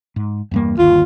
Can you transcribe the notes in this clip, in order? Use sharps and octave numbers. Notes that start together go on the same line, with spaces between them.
G#2
E2 G2 A#3
G1 D#2 F4